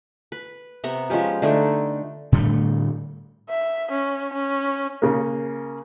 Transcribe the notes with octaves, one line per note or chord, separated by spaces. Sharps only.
B4
C3 B3 A#5 C#6
F3 G#3 C#4 G4
D3 A3 D4 D#4
A2 D3 G3 A3
E5
C#4
C#4
C#3 A#3